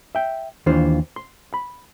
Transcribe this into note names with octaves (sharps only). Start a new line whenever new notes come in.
E5 G5
D#2 E3 D4 F4 C5
C6
B5